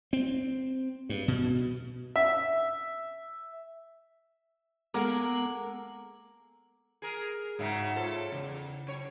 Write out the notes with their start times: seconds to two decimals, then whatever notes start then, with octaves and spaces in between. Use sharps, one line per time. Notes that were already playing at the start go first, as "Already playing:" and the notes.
0.13 C4
1.09 G2
1.28 B2
2.16 E5
4.94 G#3 A#3 B3 A4 A#4 F#5 D6
7.02 G#4 A#4
7.59 G#2 C#3 F#3 D#4 E5 B6
7.96 F4 A4 C5 C#5
8.32 E2 C#3
8.87 F#2 C#5